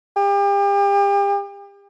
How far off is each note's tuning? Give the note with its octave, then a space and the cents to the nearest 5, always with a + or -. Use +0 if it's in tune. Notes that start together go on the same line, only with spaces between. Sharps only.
G4 +40